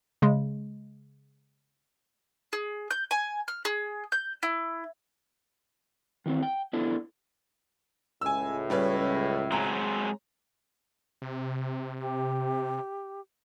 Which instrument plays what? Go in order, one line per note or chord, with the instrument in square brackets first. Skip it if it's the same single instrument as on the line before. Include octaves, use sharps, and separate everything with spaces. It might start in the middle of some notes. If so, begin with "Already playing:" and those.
[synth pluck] C#3 G#3
[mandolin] G#4
G6
G#5
F6
G#4
G6
E4
[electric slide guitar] D#3 E3 B3 C4
G5
B3 D4 E4 A4
[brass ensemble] C#2 A2 [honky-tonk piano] G#5 E6
[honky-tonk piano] G3 C#4 B4
[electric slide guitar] F#3 G#3 C4 [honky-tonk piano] A#5
[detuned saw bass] C3
[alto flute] G4